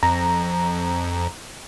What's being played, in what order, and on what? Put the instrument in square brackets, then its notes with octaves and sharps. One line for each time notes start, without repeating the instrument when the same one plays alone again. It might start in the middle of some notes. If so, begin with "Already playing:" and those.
[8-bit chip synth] F2 [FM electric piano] A#5